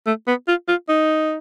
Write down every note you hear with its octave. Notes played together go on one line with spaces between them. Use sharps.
A3
B3
F4
F4
D#4